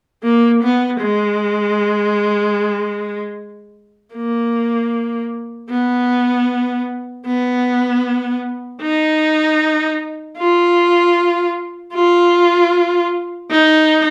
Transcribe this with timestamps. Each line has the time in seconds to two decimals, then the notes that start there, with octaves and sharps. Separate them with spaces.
0.24 A#3
0.63 B3
1.02 G#3
4.14 A#3
5.70 B3
7.26 B3
8.82 D#4
10.38 F4
11.94 F4
13.51 D#4